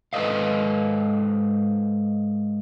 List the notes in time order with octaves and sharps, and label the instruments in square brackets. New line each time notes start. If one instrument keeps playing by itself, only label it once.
[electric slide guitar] G#2 A4 B4 D5 D#5 F5